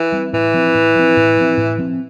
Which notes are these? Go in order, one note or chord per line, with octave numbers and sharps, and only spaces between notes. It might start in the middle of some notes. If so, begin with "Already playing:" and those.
Already playing: E3
G3 C4
A2 E3
F3 C4
A2
F3 C4
A2
F3 C4
A2
F3 C4